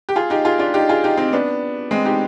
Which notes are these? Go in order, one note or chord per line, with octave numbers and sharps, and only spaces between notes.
G4
F4 G#4
D#4 G4
F4 G#4
D4 F4
D#4 G4
F4 G#4
D#4 G4
C4 D#4
B3 D4
G#3 C4
D#4 G4